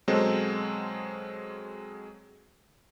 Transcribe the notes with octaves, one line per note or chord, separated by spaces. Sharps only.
B2 F#3 G#3 C4 A4